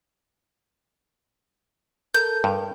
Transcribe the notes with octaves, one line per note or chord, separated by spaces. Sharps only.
A4 A#4 G6
G2